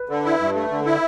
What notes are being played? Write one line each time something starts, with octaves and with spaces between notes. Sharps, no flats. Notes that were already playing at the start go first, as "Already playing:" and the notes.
Already playing: B4
D3
E4
G2
A3
D3
E4